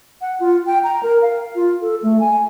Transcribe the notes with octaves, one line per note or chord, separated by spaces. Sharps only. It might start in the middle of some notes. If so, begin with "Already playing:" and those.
F#5
F4
G5
A#5
A#4
F5
F4
A4
A3
G#5